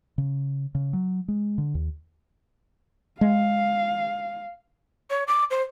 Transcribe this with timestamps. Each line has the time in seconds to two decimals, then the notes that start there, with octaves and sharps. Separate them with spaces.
0.18 C#3
0.75 C#3
0.93 F#3
1.28 G#3
1.58 D3
1.75 D#2
3.21 G#3 F5
5.10 C#5
5.28 D6
5.51 C5